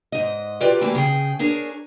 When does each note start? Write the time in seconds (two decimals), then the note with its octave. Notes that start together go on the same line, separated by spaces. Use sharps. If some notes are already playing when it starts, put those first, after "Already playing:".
0.12 G#2 D#5
0.60 E4 F4 G4 A#4 B4 D5
0.81 E3 A3 A#3 G4 B4
0.95 C#3 G#4 G5
1.39 D4 G#4 A#4 C#5